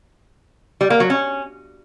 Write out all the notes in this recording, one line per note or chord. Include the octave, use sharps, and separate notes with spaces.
G3
A#3
F#3
C#4